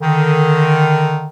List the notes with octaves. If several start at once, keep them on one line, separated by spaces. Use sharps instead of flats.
D3 D#3